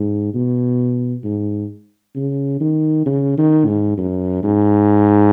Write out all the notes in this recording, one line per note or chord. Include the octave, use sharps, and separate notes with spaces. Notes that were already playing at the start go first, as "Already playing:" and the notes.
Already playing: G#2
B2
G#2
C#3
D#3
C#3
D#3
G#2
F#2
G#2